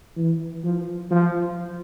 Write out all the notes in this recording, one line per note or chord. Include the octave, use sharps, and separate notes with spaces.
E3
F3
F3